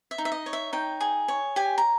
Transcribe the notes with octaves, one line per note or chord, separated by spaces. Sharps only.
E5
D#4
E5
D#5
C#5
E5
D#4 G5
G#4
C#5
G4 G#5
A#5